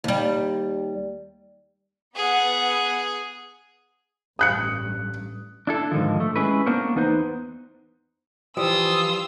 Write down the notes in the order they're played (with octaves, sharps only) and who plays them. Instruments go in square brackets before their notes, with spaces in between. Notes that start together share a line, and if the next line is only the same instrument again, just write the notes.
[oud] D#2 G3
[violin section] B3 F#5 [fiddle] G#4
[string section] A1 G2 [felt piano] D#6 F#6 C#7
[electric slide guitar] D4 E4 A4
G#2 D3 D#3 F3
A3
G#3 C#4 E4 B4
A#3 B3 D4 A#4 C5 C#5
E2 B3 D#4 B4 C5
[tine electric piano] E3 F3 [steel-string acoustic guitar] G3 [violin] F4 E6 [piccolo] D#6